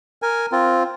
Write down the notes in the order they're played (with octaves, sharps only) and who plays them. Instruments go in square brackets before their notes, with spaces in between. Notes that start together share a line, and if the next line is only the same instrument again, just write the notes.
[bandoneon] A#4 G#5
C4 F4